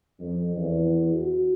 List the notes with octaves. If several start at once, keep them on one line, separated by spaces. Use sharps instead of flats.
F2
E2
F#4